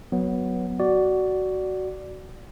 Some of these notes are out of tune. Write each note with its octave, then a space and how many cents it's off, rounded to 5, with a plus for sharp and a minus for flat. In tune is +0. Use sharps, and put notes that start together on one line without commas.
F#3 +0 B3 +0
F#4 +15 D5 +0